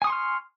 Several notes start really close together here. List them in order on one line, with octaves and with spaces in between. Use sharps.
G#5 D#6 C#6 C6 F6